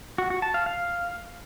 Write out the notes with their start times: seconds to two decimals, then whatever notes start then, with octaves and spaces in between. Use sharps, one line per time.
0.18 F#4
0.30 F#4
0.42 A5
0.54 F5
0.66 F5